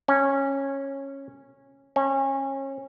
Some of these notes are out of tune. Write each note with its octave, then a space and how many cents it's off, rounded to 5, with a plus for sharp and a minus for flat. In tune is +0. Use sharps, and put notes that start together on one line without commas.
C#4 -15
C#4 -30